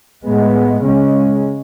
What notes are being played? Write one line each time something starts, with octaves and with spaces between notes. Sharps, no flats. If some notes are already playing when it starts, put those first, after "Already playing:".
A2 G#3 B3
C#3 G#3 C#4